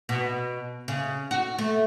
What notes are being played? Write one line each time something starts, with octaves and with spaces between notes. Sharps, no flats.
B2
C#3
F#4
A3